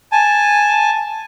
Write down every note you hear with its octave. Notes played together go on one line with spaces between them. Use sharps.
G#5 A5